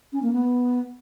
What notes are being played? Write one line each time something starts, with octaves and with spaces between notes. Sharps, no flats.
C#4
A#3
B3